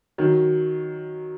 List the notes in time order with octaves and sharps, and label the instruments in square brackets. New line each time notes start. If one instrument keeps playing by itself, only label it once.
[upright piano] D#3 F#3